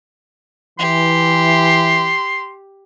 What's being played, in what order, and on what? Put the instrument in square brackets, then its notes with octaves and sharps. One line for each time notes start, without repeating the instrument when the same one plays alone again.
[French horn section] E3 [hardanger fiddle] G4 [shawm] C6